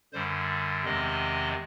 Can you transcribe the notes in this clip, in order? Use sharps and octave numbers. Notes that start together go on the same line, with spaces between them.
F#2 D3 G3 C5
E2 C3 D#3 G#3 C4 D#5